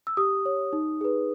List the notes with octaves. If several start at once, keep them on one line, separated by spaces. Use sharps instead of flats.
E6
G4 D#6
C#5
D#4
G#4 B4